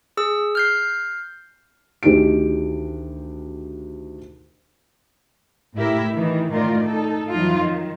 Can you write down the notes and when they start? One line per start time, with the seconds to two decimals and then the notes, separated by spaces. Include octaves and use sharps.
0.17 G#4 E6
0.55 F6 G6 C7
2.03 D2 D#3 G4 G#4 D7
5.76 A2 E4 G4 A#4 E5
6.13 D#3 E3
6.53 A2 D#3 F4 A#4 D5
6.84 D#4 A4
7.31 F2 E3 F#3 D#4 F4
7.60 D#3